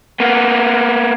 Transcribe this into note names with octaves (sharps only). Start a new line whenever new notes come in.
A#3 B3